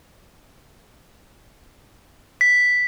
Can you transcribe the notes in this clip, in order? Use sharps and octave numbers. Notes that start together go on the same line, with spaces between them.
B6